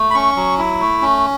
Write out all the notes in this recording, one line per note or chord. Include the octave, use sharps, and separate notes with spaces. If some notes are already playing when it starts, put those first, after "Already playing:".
Already playing: A3
B5
C#4 C#6
F#3
E4
A3
C#4